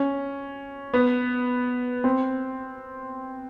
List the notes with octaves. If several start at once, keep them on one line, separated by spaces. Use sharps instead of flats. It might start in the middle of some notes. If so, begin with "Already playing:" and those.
Already playing: C#4
B3
C4